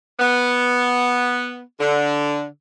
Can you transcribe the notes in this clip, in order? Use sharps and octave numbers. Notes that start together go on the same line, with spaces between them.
B3
D3